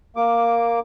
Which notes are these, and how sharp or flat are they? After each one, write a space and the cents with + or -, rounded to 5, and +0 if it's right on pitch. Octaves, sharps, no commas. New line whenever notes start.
A#3 +0 D6 +0